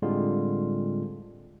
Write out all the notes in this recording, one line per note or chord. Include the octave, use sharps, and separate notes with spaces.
A2 D3 G3 G#3 C4 F4